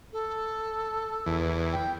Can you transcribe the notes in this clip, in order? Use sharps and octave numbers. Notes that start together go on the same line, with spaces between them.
A4
E2
G5